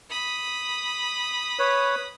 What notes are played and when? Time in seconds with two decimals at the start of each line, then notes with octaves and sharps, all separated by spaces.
0.10 B5 D#6
1.59 B4 C#5